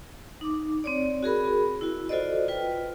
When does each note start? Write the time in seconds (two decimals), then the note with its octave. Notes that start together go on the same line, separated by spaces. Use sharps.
0.41 D#4 D6
0.84 C4 C#5 D5
1.23 F#4 G#4 A#4 B5
1.81 E4 F#4
2.09 F4 F#4 A4 C5 D5 D#5
2.48 F4 B4 G5